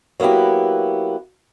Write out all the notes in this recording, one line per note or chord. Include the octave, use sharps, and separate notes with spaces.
F#3 A#3 B3 E4 G4